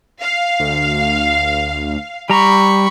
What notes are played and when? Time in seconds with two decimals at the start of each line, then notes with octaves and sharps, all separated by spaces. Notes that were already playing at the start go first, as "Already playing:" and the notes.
0.21 F5
0.60 D2
2.30 G3 A#5 B5 C#6